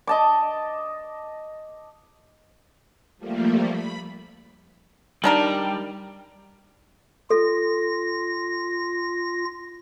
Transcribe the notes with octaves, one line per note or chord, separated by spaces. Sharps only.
D#5 A5 D6
F3 G3 A3 A#3
B5
D#3 G3 D4 A#4
F4 A4 A#6